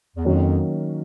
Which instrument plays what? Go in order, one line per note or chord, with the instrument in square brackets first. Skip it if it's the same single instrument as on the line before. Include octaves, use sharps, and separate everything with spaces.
[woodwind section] E2
[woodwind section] F2 [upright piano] D#3 F#3 A#3 C#4